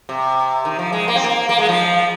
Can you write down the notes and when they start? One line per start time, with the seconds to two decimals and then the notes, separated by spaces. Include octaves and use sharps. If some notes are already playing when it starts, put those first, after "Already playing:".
0.09 C3
0.65 D#3
0.79 F3
0.93 G#3
1.08 A#3
1.16 C4
1.24 A#3
1.49 A#3
1.59 G#3
1.69 F3